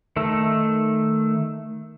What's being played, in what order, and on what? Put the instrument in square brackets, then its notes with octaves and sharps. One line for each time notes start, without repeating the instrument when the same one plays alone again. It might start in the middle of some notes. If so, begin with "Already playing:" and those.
[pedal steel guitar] D#3 A3 A4